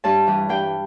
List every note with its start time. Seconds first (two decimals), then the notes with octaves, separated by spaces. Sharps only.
0.04 G2 A5
0.27 E3 G3
0.49 G2 G5